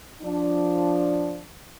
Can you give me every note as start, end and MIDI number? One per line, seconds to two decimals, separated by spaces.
0.22 1.38 53
0.22 1.38 62